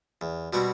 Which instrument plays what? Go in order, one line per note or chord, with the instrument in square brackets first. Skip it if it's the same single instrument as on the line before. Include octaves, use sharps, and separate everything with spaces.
[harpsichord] E2
B2 G3 C4 F#4